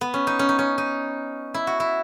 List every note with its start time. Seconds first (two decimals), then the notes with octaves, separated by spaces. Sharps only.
0.01 B3
0.14 C#4
0.27 D#4
0.39 C#4
0.49 D#4
0.59 C#4
0.78 D#4
1.54 E4
1.67 F#4
1.80 E4